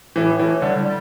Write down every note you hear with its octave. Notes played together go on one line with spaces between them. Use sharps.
A2 E3
A2 E3
D3 G3
G3